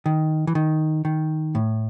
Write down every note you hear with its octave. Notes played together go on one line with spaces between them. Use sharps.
D#3
E3
D#3
D#3
A2